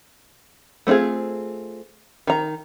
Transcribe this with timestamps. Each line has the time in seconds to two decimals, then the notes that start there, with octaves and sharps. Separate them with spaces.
0.87 A3 C4 D4 F4 G#4
2.27 D#3 A#5